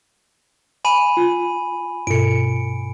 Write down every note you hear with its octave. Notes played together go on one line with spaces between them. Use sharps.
G#5 B5 D#7
F4
G2 B2 C#7 D7